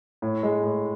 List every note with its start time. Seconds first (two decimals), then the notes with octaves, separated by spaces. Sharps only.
0.22 A2
0.43 G#3
0.63 A2